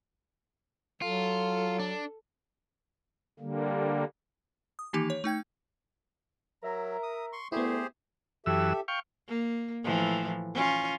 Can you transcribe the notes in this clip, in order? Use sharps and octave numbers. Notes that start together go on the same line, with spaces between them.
F#3 F4 A4
D4
D3 G3 A#3
D#6
D#3 E3 A#3 D#4 G4
C#5
A3 D#4 G5 G#6
F#3 A#4 E5 A#5
D#6
C6 C#6
D2 A3 B3 E4 G4 G#4 C5
F#2 E3 G4 A4 E5 E6
F5 G5 C#6
A#3
A2 E3 F3
C#4 F4